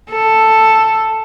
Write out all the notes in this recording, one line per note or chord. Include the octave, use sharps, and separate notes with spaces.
A4